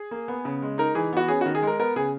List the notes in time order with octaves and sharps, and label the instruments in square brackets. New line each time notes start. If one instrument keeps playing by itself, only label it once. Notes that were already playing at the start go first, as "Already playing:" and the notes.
Already playing: [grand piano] G#4
A#3
B3
C#3
G#3
D#4 A#4
E3 G#4
B3 F#4
C#4 G#4
F#4
D#3
G#4
G#3 A#4
B3 A#4
C#3 G#4